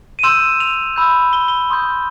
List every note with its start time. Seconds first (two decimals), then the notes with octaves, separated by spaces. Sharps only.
0.19 D#7
0.23 C6 E6 G6 E7
0.60 F7
0.96 B5 E6 G6
1.33 G7
1.48 G7
1.70 C6 D#6 G6